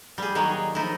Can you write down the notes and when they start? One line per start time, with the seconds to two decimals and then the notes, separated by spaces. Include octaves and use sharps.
0.18 G3 G#4
0.35 D#3 F#3 A#3 G#4 C#5
0.75 F3 D#4 E4